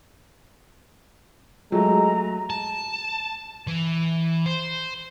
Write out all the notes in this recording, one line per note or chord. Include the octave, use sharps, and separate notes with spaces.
F#3 G#3 A3 A#5
A5
E3
C5